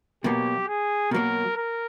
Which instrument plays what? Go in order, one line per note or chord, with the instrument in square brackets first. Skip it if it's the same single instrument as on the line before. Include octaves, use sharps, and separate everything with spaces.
[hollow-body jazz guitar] B2 F#3 A#3 [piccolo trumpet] G4
[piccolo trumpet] G#4
[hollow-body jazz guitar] B2 F#3 A#3 [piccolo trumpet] A#4
[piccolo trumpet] A#4